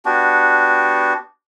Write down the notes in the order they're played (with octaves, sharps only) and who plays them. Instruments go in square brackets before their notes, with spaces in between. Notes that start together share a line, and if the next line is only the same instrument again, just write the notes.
[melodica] B3 D4 F#4 G4